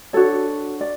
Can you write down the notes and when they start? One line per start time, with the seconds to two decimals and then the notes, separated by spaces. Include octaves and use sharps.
0.13 D4 F#4 A4 C#5
0.81 D5